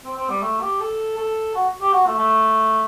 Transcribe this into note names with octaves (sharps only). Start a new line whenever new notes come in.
C4
C4
G3
A3
G4
A4
A4
F#4
G4
F#4
A3
A3